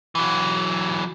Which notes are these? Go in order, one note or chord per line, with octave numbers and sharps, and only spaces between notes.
E3 F#3